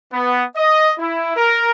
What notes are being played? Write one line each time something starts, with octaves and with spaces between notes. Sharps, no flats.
B3
D#5
E4
A#4